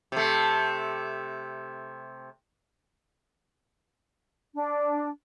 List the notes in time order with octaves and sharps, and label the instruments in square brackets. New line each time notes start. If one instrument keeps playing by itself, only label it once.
[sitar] C3 A3
[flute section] D4